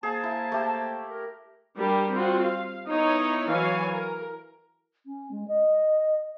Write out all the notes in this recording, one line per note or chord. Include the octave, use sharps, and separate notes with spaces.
A#3 G#4 C5 A5
E4
A3 G4
A#4
G3 D4 G4 A#4
C4 F4 F#4
F5
B3 D#4 E4 C#5
E3 F#3 C#5 F5 G#5
A#4
C#4
G#3
D#5